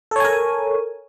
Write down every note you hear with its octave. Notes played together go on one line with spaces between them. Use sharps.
A4 A#4 C#5 G#5